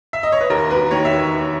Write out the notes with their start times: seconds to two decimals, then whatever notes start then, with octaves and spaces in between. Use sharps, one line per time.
0.13 E5
0.23 D#5
0.32 C#5
0.41 B4
0.50 D#2 A#4
0.70 E1 B4
0.91 D#3 C#5
1.05 E5